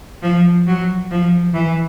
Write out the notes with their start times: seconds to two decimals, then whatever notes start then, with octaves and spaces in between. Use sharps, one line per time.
0.22 F3
0.67 F#3
1.11 F3
1.54 E3